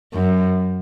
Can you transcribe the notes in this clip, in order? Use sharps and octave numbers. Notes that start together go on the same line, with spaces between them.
F#2